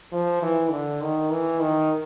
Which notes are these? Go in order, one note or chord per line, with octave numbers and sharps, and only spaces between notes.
F3
E3
D3
D#3
E3
D#3